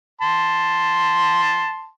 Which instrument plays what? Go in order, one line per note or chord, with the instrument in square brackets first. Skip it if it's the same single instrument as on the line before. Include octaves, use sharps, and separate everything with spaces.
[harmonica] A5 C6